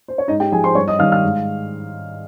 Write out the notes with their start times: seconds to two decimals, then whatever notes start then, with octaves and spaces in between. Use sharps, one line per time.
0.08 C5
0.18 C#5
0.28 G#2 D#4 D#5
0.40 G4 G5
0.52 F3 G#4 G#5
0.64 C5 C6
0.75 G2 C#5 C#6
0.88 D#5 D#6
0.99 D#3 G3 F5 F6
1.12 F5 F6
1.24 G#2